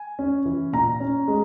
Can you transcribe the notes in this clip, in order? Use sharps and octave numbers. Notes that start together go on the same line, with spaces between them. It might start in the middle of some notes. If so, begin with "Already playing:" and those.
Already playing: G#5
C#4
E3
A#2 A#5
C#4
G#3